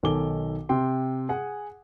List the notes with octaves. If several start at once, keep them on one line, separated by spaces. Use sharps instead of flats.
B1 D#3 A4 G#5 D6 G7
C3 G5 C6
G#4 F#5 G#5